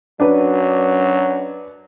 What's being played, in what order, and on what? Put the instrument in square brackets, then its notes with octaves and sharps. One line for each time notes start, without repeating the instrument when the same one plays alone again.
[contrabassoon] F#2 [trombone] F#3 [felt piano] D4 B4